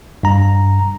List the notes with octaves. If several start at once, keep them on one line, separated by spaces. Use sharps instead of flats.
G2 A#5